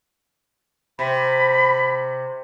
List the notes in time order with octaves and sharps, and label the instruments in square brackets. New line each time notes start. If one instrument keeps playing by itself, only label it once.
[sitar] C3 [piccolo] B5